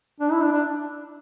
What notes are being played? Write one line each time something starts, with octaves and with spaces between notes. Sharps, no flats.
D4
E4
D4
D4